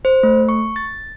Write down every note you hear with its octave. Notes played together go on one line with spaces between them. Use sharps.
C5
A3
C#6
A6